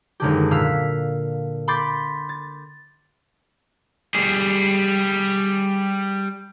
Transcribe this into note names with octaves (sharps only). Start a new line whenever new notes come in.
G#1 F#2 D3 G4
A#2 F5 E6 F#6 B6
B5 C6 D6 G6 A6 B6
A6
G3 G#4